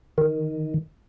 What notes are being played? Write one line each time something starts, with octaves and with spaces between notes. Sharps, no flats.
D#3